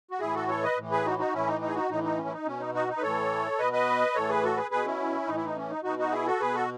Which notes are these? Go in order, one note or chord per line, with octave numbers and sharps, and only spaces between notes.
F#4
A2 E3 E4 G#4
F#4 A4
A4 C#5
B4 D#5
A2 E3
G#4 B4
D#4 F#4
D#4 F#4
A2 E3 C#4 E4
D#4
D#4
G#4
D#4 F#4
A2 E3 D#4
D#4
C#4
E4
D#4
B2 C#4
D#4
D#4 F#4
D#4
B4
A2 E3 A4 C#5
B2 B4 D#5
B4 D#5
A2 E3 A4 C#5
G#4 B4
F#4 A4
G#4 B4
B2 G#4 B4
C#4 E4
A2 E3 D#4
E4
D#4
C#4
D#4
B2 D#4 F#4
D#4 F#4
E4 G#4
F#4 A4
B2 G#4 B4
F#4 A4